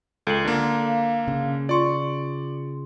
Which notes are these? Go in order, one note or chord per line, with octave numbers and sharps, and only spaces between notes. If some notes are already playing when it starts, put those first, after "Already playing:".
C#2 A4 C7 F#7
D3 A#3
F5
C#3
F4 D5 C6 C#6